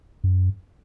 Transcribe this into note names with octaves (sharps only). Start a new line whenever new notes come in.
F#2